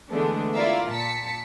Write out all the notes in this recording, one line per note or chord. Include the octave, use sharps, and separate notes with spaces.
D3 E3 G#3 A3 B3 D4
E4 F4 A#4 D5 E5 F5
A#2 A5 B6 C#7